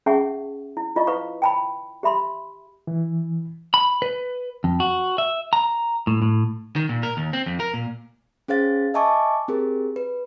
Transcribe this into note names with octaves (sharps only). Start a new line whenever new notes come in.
C#4 G#4 E5 F#5 A5 C#6
E4
E4 F4 D#5 C#6
E4 B4 F5 C#6
G5 A5 B5
G4 E5 B5 C6
E3
B5
B4
F2
F#4
E5
A#5
A2
A2
D#3
A#2
A#4
D#2
C4
F2
A#4
A#2
C#4 G#4 C5 F5 A6
D#5 E5 G#5 A5 C#6 D6
C4 G4 G#4 A#4
B4